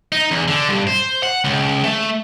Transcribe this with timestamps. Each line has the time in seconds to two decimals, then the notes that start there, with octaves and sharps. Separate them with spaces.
0.12 D#4
0.31 E2
0.48 D3
0.69 G2
0.87 C5
1.23 F#5
1.44 C#2
1.84 A3